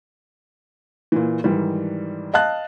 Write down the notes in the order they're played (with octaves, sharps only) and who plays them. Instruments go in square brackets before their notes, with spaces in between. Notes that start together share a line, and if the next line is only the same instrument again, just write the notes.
[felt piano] A#2 E3
G#2 D#3 E3 G3
D#5 F5 A5 F#6